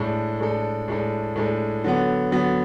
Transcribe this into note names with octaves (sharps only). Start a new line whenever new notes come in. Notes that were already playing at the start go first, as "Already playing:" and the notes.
Already playing: A2 G#3 D4 A4
A2 G#3 D4 A4
A2 G#3 D4 A4
A2 G#3 D4 A4
D3 F#3 B3
D3 F#3 B3